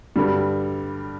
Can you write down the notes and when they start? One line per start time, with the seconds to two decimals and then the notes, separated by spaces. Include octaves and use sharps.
0.16 G2 D3 G3